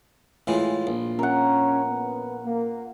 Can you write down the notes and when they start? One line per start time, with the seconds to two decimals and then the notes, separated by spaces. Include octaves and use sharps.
0.47 A2 E3 G#3 F4
0.87 A#1
1.19 C#4 A#4 F#5
1.88 B3
2.44 A#3